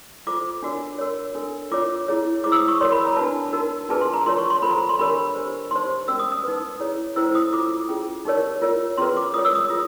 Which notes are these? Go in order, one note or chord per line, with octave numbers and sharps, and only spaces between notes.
F4 A4 C5 D6
D4 F#4 A#4 C#5
F#4 A#4 C#5
D4 F#4 A4
F4 A#4 C#5 D6
E4 G#4 C#5
E4 G#4 C5 D6
E6
D#6
C#6
F#4 A#4 C#5 C6
B5
A#5
D4 F#4 B4 A5
D#4 F#4 A#4
D4 F4 G#4 B4 A5
C6
A#5
F4 A#4 C#5 C6
C#6
C6
F4 A4 C5 B5
A#5
C6
D4 G4 A#4 C#5 B5
D4 G4 C5
D#4 G4 C5 C6
C#4 F#4 A#4 E6
D#6
D#6
D#4 F#4 B4
E4 G#4 C#5
C#4 E4 A4 C5 E6
D#6
F4 A4 C5 D6
C#4 F4 G#4
D#4 G4 A#4 C#5
F4 A#4 C#5
C#4 F4 G#4 B4 C6
D6
F4 A#4 C#5 D#6
E6
D#6
F4 G#4